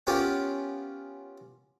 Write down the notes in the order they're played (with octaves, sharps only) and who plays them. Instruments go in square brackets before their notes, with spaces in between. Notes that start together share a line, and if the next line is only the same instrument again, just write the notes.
[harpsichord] B3 C#4 F4 G4 A#4